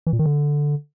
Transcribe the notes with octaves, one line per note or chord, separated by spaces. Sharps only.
E3
A#2
D#3
D3